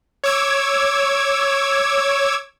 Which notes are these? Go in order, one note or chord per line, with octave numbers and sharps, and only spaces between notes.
C#5 D6 E6 G#6